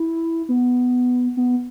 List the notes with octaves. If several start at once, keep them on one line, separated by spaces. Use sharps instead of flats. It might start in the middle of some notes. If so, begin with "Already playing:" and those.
Already playing: E4
B3
B3